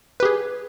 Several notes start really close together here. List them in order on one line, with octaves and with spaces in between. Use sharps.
B4 G4 G#4